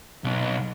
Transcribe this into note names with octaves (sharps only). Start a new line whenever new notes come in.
B1